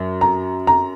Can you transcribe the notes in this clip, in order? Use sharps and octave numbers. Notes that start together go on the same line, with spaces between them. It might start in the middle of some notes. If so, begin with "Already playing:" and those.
Already playing: F#2
A#5
A#5